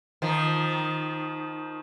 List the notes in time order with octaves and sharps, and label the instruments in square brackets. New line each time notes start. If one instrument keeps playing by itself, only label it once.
[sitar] D#3 F3